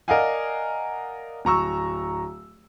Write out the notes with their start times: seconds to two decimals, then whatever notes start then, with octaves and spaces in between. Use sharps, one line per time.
0.08 A#4 D5 D#5 F5 F#5 G#5
1.45 D1 A#5 C#6 E6